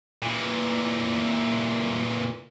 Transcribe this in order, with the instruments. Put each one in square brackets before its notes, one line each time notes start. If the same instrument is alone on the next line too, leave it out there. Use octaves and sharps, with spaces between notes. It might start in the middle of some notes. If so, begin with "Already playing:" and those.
[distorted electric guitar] A#2 E3